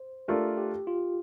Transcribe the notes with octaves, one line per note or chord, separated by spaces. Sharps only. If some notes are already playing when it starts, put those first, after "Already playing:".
Already playing: C5
A3 D4 F4 G4 A#4
G4
F4